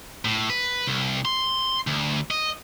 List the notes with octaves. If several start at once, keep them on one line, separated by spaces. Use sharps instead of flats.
A2
B4
C2
C6
D2
D#5